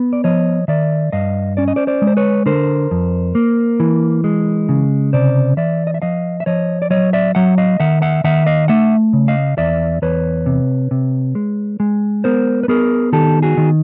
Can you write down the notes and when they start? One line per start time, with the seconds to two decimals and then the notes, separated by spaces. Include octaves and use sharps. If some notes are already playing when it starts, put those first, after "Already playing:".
Already playing: B3
0.13 D5
0.24 F3 C#5 D#5
0.68 D#3 D5 E5
1.12 G2 D#5 F5
1.57 C#4 D5
1.68 D#5
1.76 C5 D5
1.87 C5 D5
2.02 G#3
2.07 C5
2.17 B4 C#5
2.46 D3 A#4 C5
2.91 F2
3.35 A#3
3.80 E3
4.24 G#3
4.69 C#3
5.13 C3 C5 D5
5.57 E3 D5 E5
5.87 D#5
5.94 E5
6.02 F3 D#5 F5
6.40 E5
6.46 F3 C#5 D#5
6.82 D5
6.90 F#3 C#5 D#5
7.13 D5 E5
7.35 F#3 E5 F#5
7.58 D#5 F5
7.80 D#3 E5 F#5
8.02 E5 F#5
8.24 D#3 E5 F#5
8.46 D#5 F5
8.68 A3 E5 F#5
9.13 C#3
9.28 D#5 F5
9.58 E2 D5 E5
10.02 E2 B4 C#5
10.46 C3
10.91 C3
11.35 G#3
11.80 G#3
12.24 B3 A#4 C5
12.63 B4
12.68 B3 G#4 A#4
13.13 D#3 G4 A4
13.43 F#4 G#4
13.57 D#3